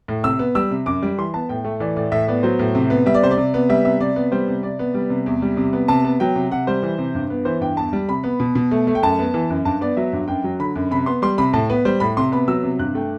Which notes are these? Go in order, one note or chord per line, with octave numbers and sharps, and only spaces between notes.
A2
C3 E6
B3
G3 E6
C3
F#2 D6
G3
E3 C6
B3 A5
A2 G5
A3
E3 D5
A2 D5
A2 E5
B3 D5
F#3 C5
A2
C3
B3
G3 E5
D5
C3 C5
D5
C3
B3
G3 E5
C3 E5
C3 D5
B3
G3 C5
C3
C3 D5
B3
G3
C3
E2
G3
C3
B3
C3 A5
B3
F#3 G5
C3
C3 F#5
G3 C5
E3
C3
G2
B3
E3 C5
G2 G5
E2 A5
G3
C3 B5
B3
B2
B2
A3
A3
G5
F#2 A5
B3
E3
F#2
G2 A5
B3 D5
F#3 E5
G2
F#2 G5
F#3
D3 B5
F#2
C3 B5
B3 C6
G3 C6
C3 B5
A2 A5
B3 B4
G3 C5
A2 B5
C3 C6
B3 B5
F#3 E6
C3
G2 F#6
A3 G5